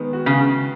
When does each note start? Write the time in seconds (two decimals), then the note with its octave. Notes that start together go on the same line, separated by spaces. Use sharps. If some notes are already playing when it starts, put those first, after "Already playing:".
Already playing: D#3 G#3 B3
0.13 F#4
0.26 C#3